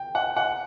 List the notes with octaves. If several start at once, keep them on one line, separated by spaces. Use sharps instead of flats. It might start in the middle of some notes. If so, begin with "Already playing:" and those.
Already playing: G5
F#5
F#5